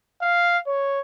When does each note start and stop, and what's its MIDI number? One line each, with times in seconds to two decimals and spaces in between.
0.22 0.58 77
0.67 1.00 73